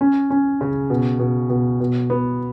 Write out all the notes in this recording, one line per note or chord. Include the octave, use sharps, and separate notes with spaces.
C#4
C#4
C#3
B2
B2
B2
B2
B3